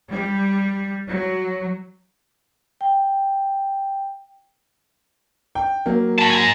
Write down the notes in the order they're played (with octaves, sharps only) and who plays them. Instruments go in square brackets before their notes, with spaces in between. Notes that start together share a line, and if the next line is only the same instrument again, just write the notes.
[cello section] G3
F#3
[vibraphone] G5
[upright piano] G5
F#3 A#3
[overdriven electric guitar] A5 B5
G#5 A#5